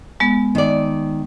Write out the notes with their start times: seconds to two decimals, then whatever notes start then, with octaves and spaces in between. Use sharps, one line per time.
0.20 G#3 B3
0.55 D#3 D5